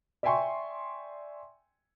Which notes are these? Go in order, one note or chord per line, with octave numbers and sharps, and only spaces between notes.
D5 E5 G5 G#5 C6 C#6